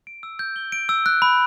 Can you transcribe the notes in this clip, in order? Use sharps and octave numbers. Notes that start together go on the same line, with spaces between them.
D7
E6
G6
G7
D7
E6
F#6
B5